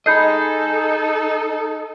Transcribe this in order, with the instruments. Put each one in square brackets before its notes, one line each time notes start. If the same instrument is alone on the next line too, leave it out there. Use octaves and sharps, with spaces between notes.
[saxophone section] D#4 A4 [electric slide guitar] G#4 D#5 [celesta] B5 G6 C7